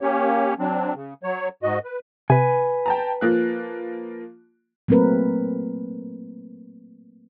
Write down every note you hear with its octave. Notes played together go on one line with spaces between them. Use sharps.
A#3 C#4 G4 C#5
F#3 C4 D4
C#3
F#3 C#5
G#2 F#4 D#5
B4
C3 B4 G#5
G5 A5 A#5
F3 A#3 F#6
F#3 A3 A#3 C4 A#4 B4